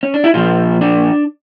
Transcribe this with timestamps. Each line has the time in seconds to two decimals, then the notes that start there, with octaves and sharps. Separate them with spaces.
0.03 C#4
0.14 D4
0.24 E4
0.34 A#2 F3 F4
0.81 D4